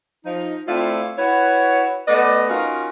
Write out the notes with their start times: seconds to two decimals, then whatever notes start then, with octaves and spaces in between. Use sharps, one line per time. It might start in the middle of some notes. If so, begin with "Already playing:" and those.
0.25 F3 D#4
0.68 A3 C4 D4 E4 F4
1.18 E4 F#4 B4 C#5
2.07 A3 B3 B4 D5 D#5
2.49 C#4 D#4 F4 F#4 A#4 D#5